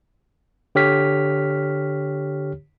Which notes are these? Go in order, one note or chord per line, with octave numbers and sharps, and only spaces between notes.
D3 G4 C#5 F6 B6